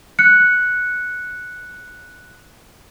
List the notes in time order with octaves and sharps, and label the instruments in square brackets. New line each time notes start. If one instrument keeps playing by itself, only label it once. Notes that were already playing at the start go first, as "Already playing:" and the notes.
[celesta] F#6 C#7